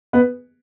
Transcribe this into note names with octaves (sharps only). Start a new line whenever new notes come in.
B3 B4